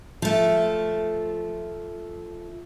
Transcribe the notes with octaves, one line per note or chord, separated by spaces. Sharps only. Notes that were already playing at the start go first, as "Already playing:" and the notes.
F3 A3